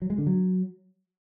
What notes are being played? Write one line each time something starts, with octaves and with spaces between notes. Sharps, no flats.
F#3
G#3
D3
F#3